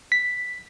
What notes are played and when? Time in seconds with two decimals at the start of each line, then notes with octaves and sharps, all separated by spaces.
0.12 B6